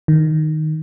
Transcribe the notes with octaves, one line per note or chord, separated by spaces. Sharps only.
D#3